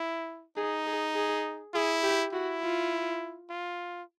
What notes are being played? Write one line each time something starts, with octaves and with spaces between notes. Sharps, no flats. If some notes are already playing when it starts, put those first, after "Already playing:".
Already playing: E4
D#4 G#4
G#4
G#4
E4 G#4
G4
E4 F#4
F4
F4